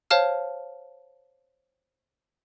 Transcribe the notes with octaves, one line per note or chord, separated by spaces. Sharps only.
C5 C#5 F5 A5 F6